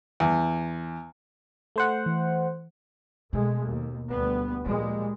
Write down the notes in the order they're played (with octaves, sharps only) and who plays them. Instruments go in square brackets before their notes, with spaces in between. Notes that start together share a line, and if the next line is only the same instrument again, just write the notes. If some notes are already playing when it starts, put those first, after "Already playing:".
[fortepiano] E2
[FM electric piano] A3 C5 F#5
[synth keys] E3
[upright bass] B2 [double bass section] G#3 A3
[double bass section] D#2
D2 G3 B3
[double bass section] A#2 G3 G#3 [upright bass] F3 A#3